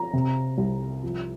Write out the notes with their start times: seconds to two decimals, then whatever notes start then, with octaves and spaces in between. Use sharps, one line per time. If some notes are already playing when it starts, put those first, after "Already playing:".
Already playing: F3 A#5
0.13 C3
0.58 C2
1.03 F3